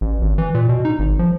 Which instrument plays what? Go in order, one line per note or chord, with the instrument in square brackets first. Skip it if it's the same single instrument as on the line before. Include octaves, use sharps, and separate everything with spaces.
[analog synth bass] A1
G#1
E3
A#2
B2
D#4
G#1
F3